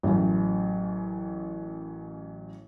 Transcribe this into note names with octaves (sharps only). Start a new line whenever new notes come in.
A1 F#2